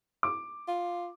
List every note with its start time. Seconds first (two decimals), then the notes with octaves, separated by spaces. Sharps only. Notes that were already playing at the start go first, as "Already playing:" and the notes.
0.23 D6
0.68 F4